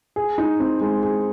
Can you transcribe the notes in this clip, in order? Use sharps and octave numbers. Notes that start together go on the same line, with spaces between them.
G#4
D#4
C4
G#3
G#4